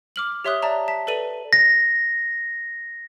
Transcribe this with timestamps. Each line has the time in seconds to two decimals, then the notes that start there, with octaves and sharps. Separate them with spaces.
0.16 D6 F6 F#7
0.45 G4 C#5 E5 C6 D#6 F#6
0.62 D5 E5 A5 A#5
0.88 A5 B6
1.07 A4 B4 D5 D#7 F#7
1.53 A#6